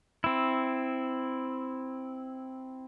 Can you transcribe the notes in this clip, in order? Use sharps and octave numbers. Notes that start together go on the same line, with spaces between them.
C4 E4